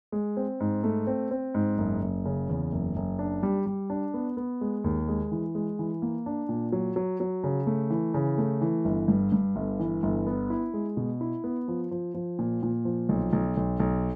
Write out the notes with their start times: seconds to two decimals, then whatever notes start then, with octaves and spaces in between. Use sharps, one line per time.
0.12 G#3
0.37 C4
0.60 G#2
0.84 A3
1.07 C4
1.31 C4
1.54 G#2
1.78 F#1
2.02 F#1
2.25 C#3
2.49 E2
2.72 F#1
2.96 F#1
3.19 D4
3.43 G3
3.66 G3
3.90 D4
4.14 B3
4.37 B3
4.61 G#3
4.84 D#2
5.08 G#3
5.32 E3
5.55 G#3
5.79 E3
6.02 A#3
6.26 D4
6.49 A#2
6.72 F#3
6.96 F#3
7.20 F#3
7.44 C#3
7.67 A3
7.90 E3
8.14 C#3
8.38 A3
8.61 E3
8.85 G1
9.08 G2
9.32 G2
9.56 G1
9.79 E3
10.03 G1
10.27 B3
10.50 E4
10.74 G#3
10.97 B2
11.21 E4
11.44 B3
11.68 F3
11.91 F3
12.14 F3
12.39 A#2
12.63 A#2
12.85 F3
13.09 B1
13.33 B1
13.57 B1
13.80 B1